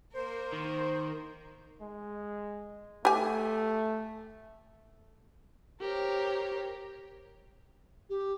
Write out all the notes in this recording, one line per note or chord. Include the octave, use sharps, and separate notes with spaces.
A#3 A#4 C5
D#3
G#3
A3 G4 G#5
G4 A#4 C5 C#5
G4